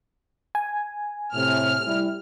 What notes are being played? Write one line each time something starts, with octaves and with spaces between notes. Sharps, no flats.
G#5
A2 C3 F6
G3 E4